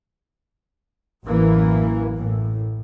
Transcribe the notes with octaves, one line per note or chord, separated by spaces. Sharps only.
A1 F#2 E3 A#3
A2